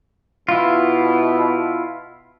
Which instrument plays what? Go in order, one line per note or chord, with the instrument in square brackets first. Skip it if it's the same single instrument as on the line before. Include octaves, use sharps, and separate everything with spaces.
[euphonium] B2 [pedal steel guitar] E4 F4